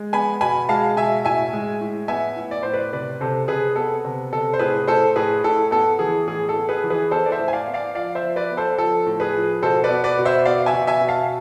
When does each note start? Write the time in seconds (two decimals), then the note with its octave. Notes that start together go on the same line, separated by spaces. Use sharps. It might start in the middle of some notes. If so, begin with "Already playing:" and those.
Already playing: G#3
0.13 B3 G#5 B5
0.41 B2 G#5 B5
0.69 G#3 F5 A5
0.97 B2 E5 G#5
1.25 A2 E5 G#5
1.53 G#3
1.81 A2
2.08 B3 E5 G#5
2.36 A2
2.51 D5
2.63 A2 C5
2.73 B4 D5
2.92 C3 B4 D5
3.21 C3 A4 C5
3.48 C3 G#4 B4
3.76 B3 A4
4.05 C3
4.33 C3 A4
4.53 C5
4.59 A2 G#4 B4
4.87 A2 A4 C5
5.16 A2 G#4 B4
5.44 A2 A4
5.71 B3 A4
5.99 E3 G#4
6.28 A2 G#4
6.49 A4
6.56 B3
6.69 G#4 B4
6.84 E3
6.90 G#4 B4
7.11 B3 A4 C5
7.26 D5
7.32 C5 E5
7.39 A2
7.48 G#5
7.53 D5 F5
7.67 B3
7.74 D5 F5
7.94 F3 D5 F5
8.15 C5 E5
8.23 F3
8.36 B4 D5
8.51 B3
8.57 A4 C5
8.78 F3 A4
9.06 A2
9.20 G#4 B4
9.35 F3
9.62 B2 A4 C5
9.84 B4 D5
9.90 B3
10.04 B4 D5
10.19 B2
10.25 C5 E5
10.45 B3 D5 F5
10.66 E5 G#5
10.74 B2
10.87 E5 G#5
11.01 B2
11.08 F5 A5